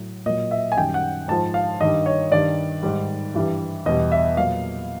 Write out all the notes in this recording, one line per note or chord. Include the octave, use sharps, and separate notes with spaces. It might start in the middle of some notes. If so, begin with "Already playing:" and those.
Already playing: A2 F#3
A#2 F#3 D#5
E5
G#5
F#2 D#3 G3 G5
F#5
G#2 F3 A5
F5
G2 D#3 G3 D#5
C#5
G2 D#3 G3 D5
G#2 D#3 G3
G2 E3 G3
E2 B2 G3 D#5
E5
A#2 F#3 F5